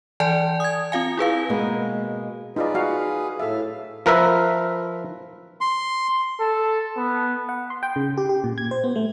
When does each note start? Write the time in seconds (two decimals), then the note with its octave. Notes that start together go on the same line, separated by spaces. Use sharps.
0.20 E3 D5 G#5 A5
0.60 D#6 G#6
0.92 C4 F4 F5 G#5
1.17 E4 G#4 B4 F5
1.49 B2 G#3 A#3 B3
2.56 D#4 F4 G#4 B4 D5
2.75 F#4 F5
3.40 A2 A4 E5 F5
4.06 F3 A#4 B4 E5
5.61 C6
6.40 A4
6.97 B3
7.49 F#5
7.70 C6
7.83 G5
7.96 C#3
8.17 G4
8.29 G4
8.44 A#2
8.58 G#6
8.71 C5
8.84 B3
8.96 A3